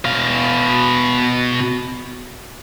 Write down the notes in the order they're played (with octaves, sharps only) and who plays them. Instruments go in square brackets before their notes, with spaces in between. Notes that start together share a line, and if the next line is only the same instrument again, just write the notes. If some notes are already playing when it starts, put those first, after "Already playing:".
[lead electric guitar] B2 F5